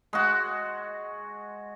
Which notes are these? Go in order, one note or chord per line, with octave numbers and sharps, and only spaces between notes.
G#3 F#4